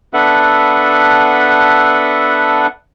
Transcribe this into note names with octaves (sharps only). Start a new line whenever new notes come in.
B3 D4 A4 B4 E5 F#5